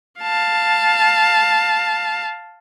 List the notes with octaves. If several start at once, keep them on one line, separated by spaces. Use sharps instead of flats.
F5 A5